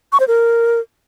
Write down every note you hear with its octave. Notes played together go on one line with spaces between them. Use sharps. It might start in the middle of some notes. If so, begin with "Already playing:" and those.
C#6
C5
A#4